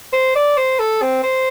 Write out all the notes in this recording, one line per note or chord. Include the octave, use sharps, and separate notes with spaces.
C5
D5
C5
A4
C4
C5